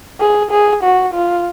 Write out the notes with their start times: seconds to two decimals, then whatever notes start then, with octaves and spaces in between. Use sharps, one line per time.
0.21 G#4
0.51 G#4
0.83 F#4
1.14 F4